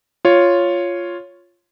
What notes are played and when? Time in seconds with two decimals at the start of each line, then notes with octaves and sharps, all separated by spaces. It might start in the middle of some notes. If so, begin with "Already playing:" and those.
0.25 F4 C#5